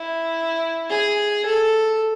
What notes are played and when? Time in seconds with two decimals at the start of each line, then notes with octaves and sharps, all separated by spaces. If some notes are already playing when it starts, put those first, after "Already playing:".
Already playing: E4
0.90 G#4
1.45 A4